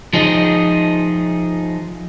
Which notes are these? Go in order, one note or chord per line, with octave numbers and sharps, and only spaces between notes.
F3 D#4 G#4 D#5